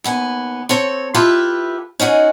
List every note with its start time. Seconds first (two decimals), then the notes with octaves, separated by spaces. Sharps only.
0.04 D#2 B3 G#5
0.69 C4 A4 C#5
1.14 E4 F4 G4 A4 B4
2.00 C#4 D#4 F#4 G#4